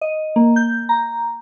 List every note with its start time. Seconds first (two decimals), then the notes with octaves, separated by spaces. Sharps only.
0.01 D#5
0.36 A#3
0.56 G6
0.89 A#5